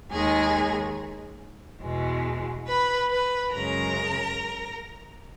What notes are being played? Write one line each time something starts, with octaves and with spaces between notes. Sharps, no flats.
D#2 D#3 G#3 G#4 G#5
E2 B2 G#3
B4 B5
B4 B5
F#2 C#3 G#3 A#4 A#5